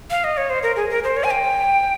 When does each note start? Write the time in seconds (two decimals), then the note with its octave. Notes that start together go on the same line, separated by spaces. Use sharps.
0.10 F5
0.24 D#5
0.37 C#5
0.50 C5
0.63 A#4
0.76 G#4
0.91 A#4
1.04 C5
1.17 C#5
1.24 G#5
1.31 G5